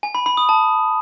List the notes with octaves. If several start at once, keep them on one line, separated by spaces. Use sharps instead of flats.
G#5
B5
B5
D#6
A5